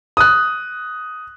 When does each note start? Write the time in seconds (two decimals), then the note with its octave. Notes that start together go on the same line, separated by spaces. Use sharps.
0.17 D#6 F#6